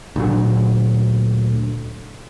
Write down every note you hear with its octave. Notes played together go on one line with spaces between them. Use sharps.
D2 A#2 F#3